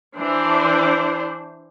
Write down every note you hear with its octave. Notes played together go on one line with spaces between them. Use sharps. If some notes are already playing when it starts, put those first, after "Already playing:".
E3 D4 C5